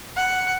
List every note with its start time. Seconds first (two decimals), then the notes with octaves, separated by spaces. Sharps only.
0.17 F#5